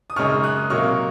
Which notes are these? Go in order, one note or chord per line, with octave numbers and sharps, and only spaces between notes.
D#6
F#2 C#3 G#3 D#4 C#6 F6
D#6 F#6
C3 F#3 A#3 D#4 C#6 F6